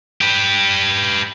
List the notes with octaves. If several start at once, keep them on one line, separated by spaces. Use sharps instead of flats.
G4 B4